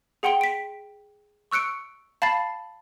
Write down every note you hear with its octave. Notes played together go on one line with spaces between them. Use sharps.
G#4 F#5 G5 C6 D7 G7
B6 D7
C#6 E6 F#6 C#7 D7
F5 A5 B5 A6 C7